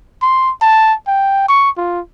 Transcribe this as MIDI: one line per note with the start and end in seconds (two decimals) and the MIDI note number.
0.22 0.51 84
0.62 0.94 81
1.07 1.45 79
1.48 1.70 85
1.77 2.00 65